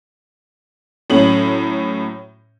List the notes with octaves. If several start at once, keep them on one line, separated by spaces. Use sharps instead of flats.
A2 F#3 C#4 F#7